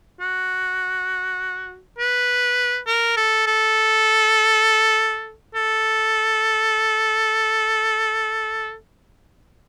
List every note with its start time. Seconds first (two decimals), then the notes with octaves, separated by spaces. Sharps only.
0.21 F#4
1.98 B4
2.87 A#4
3.17 A4
3.47 A4
5.55 A4